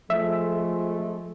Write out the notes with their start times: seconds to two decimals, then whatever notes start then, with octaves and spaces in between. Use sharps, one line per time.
0.10 F3 G#3 A3 E5